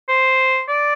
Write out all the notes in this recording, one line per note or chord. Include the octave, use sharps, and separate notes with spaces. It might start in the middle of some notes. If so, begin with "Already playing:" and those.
C5
D5